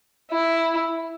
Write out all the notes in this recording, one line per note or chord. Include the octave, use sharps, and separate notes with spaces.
E4